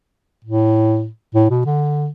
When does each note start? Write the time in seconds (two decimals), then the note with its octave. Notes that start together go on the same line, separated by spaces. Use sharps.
0.45 A2
1.35 A2
1.50 B2
1.65 D3